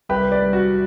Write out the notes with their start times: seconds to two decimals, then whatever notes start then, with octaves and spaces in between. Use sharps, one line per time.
0.09 C2 G4 B4
0.31 B4 D5
0.42 G3
0.53 F#4